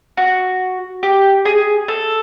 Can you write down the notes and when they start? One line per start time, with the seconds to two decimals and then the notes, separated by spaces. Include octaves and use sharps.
0.17 F#4
1.03 G4
1.45 G#4
1.88 A4